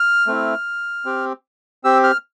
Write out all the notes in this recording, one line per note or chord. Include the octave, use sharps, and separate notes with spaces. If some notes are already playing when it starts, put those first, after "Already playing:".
Already playing: F6
A3 C4 E4
C4 G4
C4 G4 E6
F6